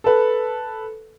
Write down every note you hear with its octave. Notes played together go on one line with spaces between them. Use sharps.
A4 B4